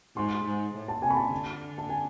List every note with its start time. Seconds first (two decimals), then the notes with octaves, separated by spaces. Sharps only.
0.16 G#2 C6
0.45 G#2
0.74 A2
0.88 A5
1.02 C3 G#5
1.10 B5
1.17 A5
1.32 D3
1.78 A5
1.89 G#5